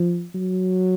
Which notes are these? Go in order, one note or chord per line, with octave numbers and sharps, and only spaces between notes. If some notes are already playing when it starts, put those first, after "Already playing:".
Already playing: F3
F#3